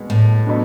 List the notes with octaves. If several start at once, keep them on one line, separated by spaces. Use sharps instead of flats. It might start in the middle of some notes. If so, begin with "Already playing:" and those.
Already playing: B2 G#3 B3
A2
B2 F#3 B3 D4